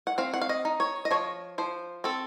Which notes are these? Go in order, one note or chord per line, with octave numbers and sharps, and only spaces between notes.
F#5
C4 F5
F#5
F5
D#5
D#4
C#5
D#5
F3 C#5
F3 C5
C4 A4